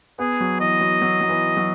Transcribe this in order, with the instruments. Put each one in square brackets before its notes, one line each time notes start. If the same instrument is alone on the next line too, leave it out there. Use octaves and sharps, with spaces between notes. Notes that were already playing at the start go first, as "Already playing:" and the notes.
[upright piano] B3 [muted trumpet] G#4
[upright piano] F#3
[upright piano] E3 [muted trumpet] D#5
[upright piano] F#3
F#3
F#3
E3
F#3